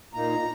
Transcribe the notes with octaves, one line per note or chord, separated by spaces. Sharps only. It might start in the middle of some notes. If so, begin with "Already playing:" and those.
A#2 A#3 D#4 A#5